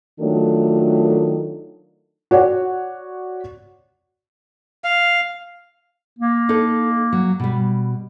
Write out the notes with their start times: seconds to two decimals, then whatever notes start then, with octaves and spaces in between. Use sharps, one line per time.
0.20 D#3 F#3 A3 D4 F4 A4
2.31 F#4 C#5 D5 F#5
4.84 F5
6.19 A#3
6.49 D4 D#4 A4
7.13 F#3
7.40 B2 G3